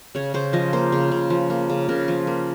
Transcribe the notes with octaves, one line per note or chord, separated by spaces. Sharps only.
C#3 C#5
C#3 C5
F3 D#5
A#3 C5
C#3
C#3
F3
A#3
C#3
C#3 A#4
F3
A#3